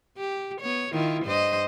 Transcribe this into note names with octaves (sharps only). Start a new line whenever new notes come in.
G4
B3 C#5
D#3 E4 F4
G2 C5 D#5